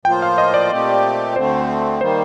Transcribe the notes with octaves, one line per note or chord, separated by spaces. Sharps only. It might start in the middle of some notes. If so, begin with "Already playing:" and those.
A2 F3 A#3 F4 C5 G5
F5
D#5
D5
A#2 A3 C4 G4
D2 D3 A3 C4 C5
D#3 G3 A#3 C5